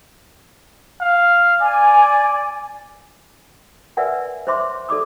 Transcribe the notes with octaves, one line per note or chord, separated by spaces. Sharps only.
F5
D5 G#5
A#4 B4 D5 E5 F#5 G#5
C5 C#5 E5 C6 D6
A4 D5 D6 D#6